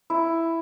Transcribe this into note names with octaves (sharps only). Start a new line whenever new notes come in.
E4